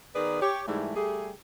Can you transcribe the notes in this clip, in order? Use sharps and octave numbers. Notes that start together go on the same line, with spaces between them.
D#3 B3 G#4 A#4 B4 D5
G4 C#5
G#2 E3 G3 A3 E4
G3 A3 G4 G#4